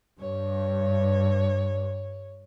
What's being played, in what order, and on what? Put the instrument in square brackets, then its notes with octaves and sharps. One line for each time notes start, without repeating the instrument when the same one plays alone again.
[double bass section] G2 [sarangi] C#5